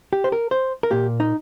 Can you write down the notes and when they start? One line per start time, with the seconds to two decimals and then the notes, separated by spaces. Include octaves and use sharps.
0.13 G4
0.24 C5
0.32 A#4
0.51 C5
0.83 A#4
0.91 A#2 A#3 G4
1.20 D#4